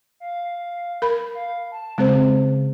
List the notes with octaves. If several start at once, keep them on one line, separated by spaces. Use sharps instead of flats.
F5
A#4 B5
F5
A5
C#3 G#3 C4 C5